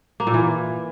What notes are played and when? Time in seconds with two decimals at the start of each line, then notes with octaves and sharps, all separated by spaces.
0.20 A#3
0.27 A#2
0.34 E3